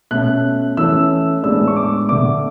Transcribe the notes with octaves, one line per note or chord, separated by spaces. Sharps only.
B2 A3 C#4 F#6
E3 A3 C#4 E6
A2 G#3 B3 D4 E6
C#6
D6
D3 A3 D4 D6